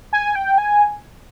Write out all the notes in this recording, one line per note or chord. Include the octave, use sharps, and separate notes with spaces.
G#5
G5
G#5